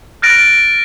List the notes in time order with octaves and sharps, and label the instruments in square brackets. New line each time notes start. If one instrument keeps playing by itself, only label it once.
[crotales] F6 F#6 A6 A#6 D7